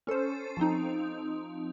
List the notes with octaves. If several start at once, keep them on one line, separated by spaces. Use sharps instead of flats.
C#4 A4 C5
F3 C4 D#4